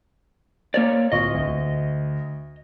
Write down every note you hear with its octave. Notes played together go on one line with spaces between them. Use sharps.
A#3 A#4 C#5 D5
D1 F4 D#5 C#6
D2